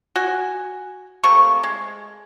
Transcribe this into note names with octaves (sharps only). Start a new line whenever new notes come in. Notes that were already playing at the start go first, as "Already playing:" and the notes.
F#4 G#5
C3 A3 A#3 C#6
G#3